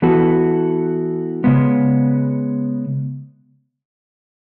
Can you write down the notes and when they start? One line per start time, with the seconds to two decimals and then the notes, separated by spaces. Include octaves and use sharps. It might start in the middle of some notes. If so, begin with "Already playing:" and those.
0.02 E3 B3 F#4 A4
1.44 C#3 G#3 B3